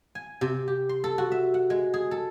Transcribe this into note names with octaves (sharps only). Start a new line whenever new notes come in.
G#5
C3
G4
C6
A4
F#4
E5
F#5
G#3
G#4
A4